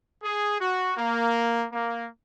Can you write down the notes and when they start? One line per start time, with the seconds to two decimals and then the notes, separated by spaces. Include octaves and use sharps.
0.22 G#4
0.59 F#4
0.97 A#3
1.72 A#3